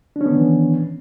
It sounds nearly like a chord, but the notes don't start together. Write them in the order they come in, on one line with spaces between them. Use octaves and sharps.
D4 C#4 B3 D#3 E3